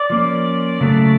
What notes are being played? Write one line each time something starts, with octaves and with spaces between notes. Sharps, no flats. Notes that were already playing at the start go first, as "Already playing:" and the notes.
Already playing: D5
F3 A#3 C#4
C#3 F#3 A3